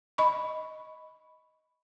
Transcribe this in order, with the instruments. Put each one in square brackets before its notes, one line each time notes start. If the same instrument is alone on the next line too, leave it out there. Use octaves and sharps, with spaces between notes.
[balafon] D#5 B5 C#6